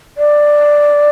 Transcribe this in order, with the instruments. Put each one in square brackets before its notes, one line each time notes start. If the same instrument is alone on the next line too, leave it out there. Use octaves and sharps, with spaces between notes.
[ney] D5